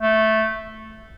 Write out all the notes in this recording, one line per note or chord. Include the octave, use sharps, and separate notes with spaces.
A3